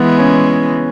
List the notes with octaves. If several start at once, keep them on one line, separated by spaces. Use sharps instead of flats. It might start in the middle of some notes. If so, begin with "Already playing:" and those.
Already playing: E3 G#3 B3
C#4